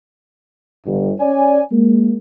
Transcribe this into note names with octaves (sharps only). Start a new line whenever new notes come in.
G1
C#4 C#5 D5 G#5
G#3 A#3